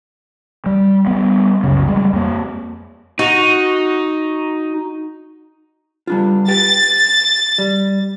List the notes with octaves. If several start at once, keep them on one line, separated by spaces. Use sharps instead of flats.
G3
G3 B3
C2 F#2 C#3
G3 G#3
F2 A#3
D#4 F#4
G3 D4 F4
G4 B4 G5 A6
G3